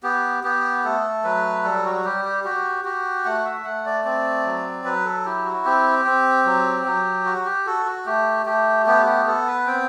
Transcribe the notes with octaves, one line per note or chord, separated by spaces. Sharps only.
B3 G4
B3 G4
A3 A4
F#3 B4
G3 A4
F#4
G3 G4
G4
F#4 G4
F#4 G4
A3 F#5
E5
A3 F#5
D5
C4 D5
F#3
F#3 B4
A4
E4 G4
F#4
C4 G4
C4
F#3
F#3
F#4
G4
F#4 A4
F#4
A3 G4
A3 G4
B3 G4
G4
B3 A4
B4
C4 G5